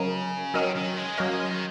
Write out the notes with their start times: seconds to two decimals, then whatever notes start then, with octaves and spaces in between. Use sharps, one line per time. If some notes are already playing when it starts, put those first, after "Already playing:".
Already playing: C#3 F#3 C#4 A#4 D#5
0.54 D#3 F#3 C#4 A#4 D#5
0.75 D#3
0.97 G#3
1.18 F#3 A#3 C#4 A#4 D#5
1.34 G#3
1.48 D#3